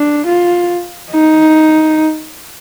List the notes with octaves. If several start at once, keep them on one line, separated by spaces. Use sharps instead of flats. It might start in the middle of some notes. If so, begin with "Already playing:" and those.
Already playing: D4
F4
D#4